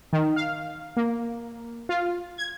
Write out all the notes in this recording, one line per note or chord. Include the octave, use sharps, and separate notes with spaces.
D#3
F5
A#3
F4
G#6